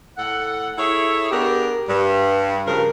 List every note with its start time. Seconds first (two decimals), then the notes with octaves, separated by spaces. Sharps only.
0.17 A2 A4 F#5
0.78 E4 G#4 A4 C#5 E5
1.31 B3 D4 G4 G#4 A#4
1.88 G2
2.66 G2 C#3 F3 A#4